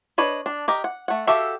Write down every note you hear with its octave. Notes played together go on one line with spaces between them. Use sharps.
D4 B4 C#5 D#5
D4
G4 A#4 D#5
F#5
A3 F#5
F#4 G4 A4 E5 F5